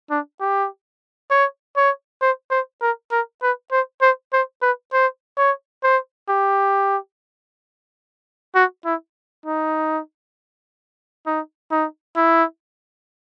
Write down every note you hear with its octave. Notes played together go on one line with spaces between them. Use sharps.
D4
G4
C#5
C#5
C5
C5
A#4
A#4
B4
C5
C5
C5
B4
C5
C#5
C5
G4
F#4
E4
D#4
D#4
D#4
E4